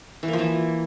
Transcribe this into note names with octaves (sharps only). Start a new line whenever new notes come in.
E3
A#3
F3
E3